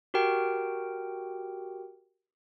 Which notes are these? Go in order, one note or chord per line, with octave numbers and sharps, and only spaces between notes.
F#4 G4 A#4 G5